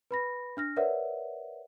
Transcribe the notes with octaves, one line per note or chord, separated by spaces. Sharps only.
B4 B5 A#6
D4 F6 A#6
A#4 B4 C#5 D5 E5 F#5